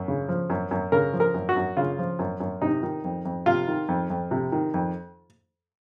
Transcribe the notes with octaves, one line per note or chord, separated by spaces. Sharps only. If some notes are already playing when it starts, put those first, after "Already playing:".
Already playing: F#2
C#3
F3
F#2
F#2
C#3 A#4
F3
A#4
F#2
F#4
F#2
C#3 F4
F3
F#2
F#2
C3 D#4
D#3
F2
F2
C3 F4
D#3
F2
F2
C3
D#3
F2